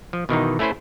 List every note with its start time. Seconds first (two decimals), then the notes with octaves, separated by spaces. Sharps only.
0.13 F3
0.29 B2 D#3 E3 D#4
0.59 A3 C#4 E4 B4 C5